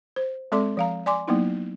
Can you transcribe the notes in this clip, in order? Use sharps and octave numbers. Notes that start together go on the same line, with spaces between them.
C5
G#3 C4 A4 D5 C6 D6
F3 F5 A#5
D5 G#5 C6 D6
F#3 A#3 B3 D#4 E4